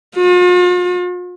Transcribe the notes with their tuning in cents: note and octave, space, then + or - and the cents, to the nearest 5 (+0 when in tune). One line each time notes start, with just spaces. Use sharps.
F4 +45